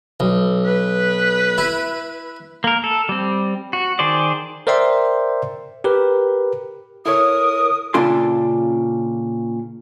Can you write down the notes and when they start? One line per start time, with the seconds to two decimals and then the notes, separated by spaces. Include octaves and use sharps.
0.20 B1
0.66 B4
1.58 E4
2.64 A#3 A#4
2.84 A4
3.09 G3 C4
3.73 F#4
3.99 D#3 G#4 C5 D5
4.67 A#4 C5 D5 E5 G5 C6
5.84 G4 A#4 B4
7.06 E4 A4 A#4 C#5 D#6
7.94 A#2 C#3 D4 F4 A4 C6